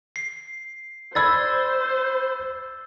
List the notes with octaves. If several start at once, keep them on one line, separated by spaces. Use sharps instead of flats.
C7
C5 D5 B5 E6 G#6 A6